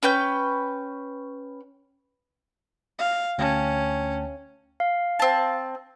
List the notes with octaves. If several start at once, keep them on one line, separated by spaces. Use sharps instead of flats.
C#4 B4 G5 G6
F5
D2 C#4 G5 A5
F5
C4 A5